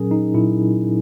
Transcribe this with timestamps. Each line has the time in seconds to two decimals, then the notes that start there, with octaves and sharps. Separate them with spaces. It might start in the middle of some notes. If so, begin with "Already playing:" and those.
Already playing: A#2 F#3 C#4 G#4 A#4
0.11 D#4
0.35 A#2 F#3 E4